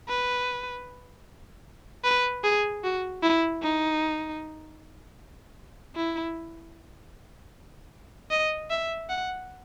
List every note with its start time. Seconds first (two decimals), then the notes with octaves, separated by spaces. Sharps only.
0.09 B4
2.04 B4
2.43 G#4
2.83 F#4
3.23 E4
3.62 D#4
5.96 E4
8.31 D#5
8.70 E5
9.09 F#5